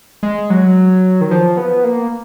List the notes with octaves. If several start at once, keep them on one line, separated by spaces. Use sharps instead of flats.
G#3
F#3
D#3
F3
B3
A#3